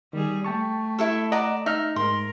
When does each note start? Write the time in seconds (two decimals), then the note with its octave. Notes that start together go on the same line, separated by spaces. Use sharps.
0.13 D#3 G3 G#4
0.44 A3 G5 A5 C#6
0.99 E4 A4 E5
1.32 D5 D#5 F#5 A5 A#5
1.66 D#4 E5 F6
1.96 G#2 A#4 C6